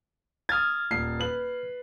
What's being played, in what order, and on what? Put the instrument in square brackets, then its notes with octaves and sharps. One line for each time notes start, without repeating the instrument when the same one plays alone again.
[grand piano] D#6 A6 [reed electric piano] F6 G#6
[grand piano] D#1 C7
B4 F#7